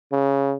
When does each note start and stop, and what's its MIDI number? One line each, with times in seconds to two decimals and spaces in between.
0.12 0.56 49